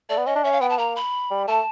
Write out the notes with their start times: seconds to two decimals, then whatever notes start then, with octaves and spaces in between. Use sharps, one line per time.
0.09 A3 D5
0.18 B3
0.26 C#4 D#5
0.36 D4
0.44 C#4 E5
0.52 F5
0.61 B3 G5
0.70 A5
0.78 A#3 A#5
0.96 B5
1.31 G3
1.48 A3 A5